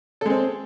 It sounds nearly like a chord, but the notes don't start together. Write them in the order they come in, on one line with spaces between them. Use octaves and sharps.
A4 G#3 C4